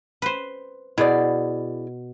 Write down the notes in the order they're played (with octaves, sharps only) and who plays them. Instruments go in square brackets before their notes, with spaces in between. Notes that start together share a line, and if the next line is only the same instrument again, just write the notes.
[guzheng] B4 C5
[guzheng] B2 [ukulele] E4 G#4 D5